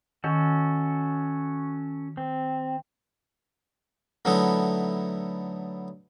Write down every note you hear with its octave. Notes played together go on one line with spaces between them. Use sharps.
D#3 C#4 F#4 A4
C4
D3 F#3 A3 B3 D#4 E4